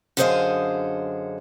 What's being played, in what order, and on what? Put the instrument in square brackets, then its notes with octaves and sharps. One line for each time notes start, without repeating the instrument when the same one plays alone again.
[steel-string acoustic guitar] F#2 D3 G#4 C5 D#5 F5